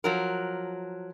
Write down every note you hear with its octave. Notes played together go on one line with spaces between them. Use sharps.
F3 F#3 A#4